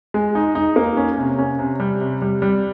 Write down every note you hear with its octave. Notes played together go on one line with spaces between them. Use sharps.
G#3
D#4
D#4
A#3
C#4
C3
C#4
C3
G3
C3
G3
G3